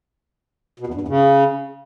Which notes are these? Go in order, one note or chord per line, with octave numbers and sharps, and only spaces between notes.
B2
E2
G2
E2
C#3